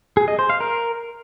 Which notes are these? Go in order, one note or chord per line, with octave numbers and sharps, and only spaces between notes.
G#4
D#5
C5
F5
A#4